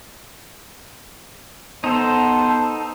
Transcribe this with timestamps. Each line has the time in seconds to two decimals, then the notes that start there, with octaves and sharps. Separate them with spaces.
1.84 B3 D#4 A4 C5 A5